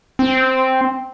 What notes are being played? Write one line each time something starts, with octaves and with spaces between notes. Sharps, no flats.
C4